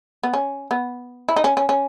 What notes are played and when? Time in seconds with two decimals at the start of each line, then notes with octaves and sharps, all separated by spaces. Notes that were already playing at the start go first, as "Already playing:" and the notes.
0.23 B3
0.34 C#4
0.71 B3
1.29 E4
1.36 D#4
1.44 C#4
1.57 C#4
1.69 C#4